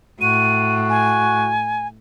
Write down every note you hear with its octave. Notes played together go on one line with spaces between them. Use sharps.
A2 F#4 D#7
G#5